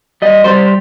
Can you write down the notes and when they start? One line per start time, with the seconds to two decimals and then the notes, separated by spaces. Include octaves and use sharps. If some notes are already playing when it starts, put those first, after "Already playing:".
0.22 G3 D#5
0.44 G3 C5